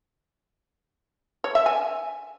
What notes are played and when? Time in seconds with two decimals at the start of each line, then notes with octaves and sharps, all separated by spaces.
1.44 C#5
1.55 E5
1.66 G#5